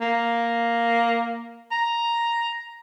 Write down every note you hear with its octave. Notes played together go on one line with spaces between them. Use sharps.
A#3
A#5